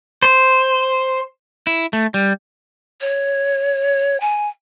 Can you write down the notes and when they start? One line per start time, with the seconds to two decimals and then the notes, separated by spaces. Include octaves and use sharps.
0.22 C5
1.67 E4
1.93 A3
2.14 G3
3.01 C#5
4.20 G#5